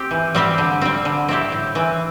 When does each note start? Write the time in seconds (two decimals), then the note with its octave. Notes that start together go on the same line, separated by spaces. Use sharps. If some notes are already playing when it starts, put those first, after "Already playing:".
Already playing: C4 G4
0.11 E3
0.35 G3 C4 G4
0.58 D3
0.82 G3 C4
1.05 D3
1.28 C4 E4 G4
1.52 A2
1.75 E3 C4